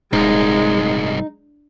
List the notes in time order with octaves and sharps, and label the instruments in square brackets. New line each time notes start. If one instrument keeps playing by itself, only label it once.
[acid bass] D#1 [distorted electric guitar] C2 G#2 [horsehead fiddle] G#3 [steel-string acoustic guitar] D#4